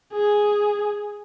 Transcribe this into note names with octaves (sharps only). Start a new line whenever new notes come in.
G#4